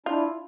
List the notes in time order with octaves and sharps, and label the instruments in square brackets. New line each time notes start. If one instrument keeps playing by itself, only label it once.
[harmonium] D4 E4 [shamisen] F4